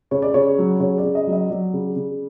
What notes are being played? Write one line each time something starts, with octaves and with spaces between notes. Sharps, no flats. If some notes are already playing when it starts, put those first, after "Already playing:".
C#3 C#5
D5
C#3 C#5
F#3
C#3 C#5
D5
C#3
D#5
F#3
D#5
F#3 D5
C#3
C#3